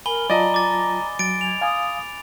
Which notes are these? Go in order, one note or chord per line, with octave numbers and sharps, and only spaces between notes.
A#4 G#5 B5 G7
F#3 F4 D5 D#5 A5 A#5
D6 A6
F#3 A6 D7
G#5 F7
F5 G#5 D#6